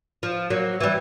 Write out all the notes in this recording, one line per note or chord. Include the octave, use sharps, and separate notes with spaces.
F3
F#3 A#3
E3 G3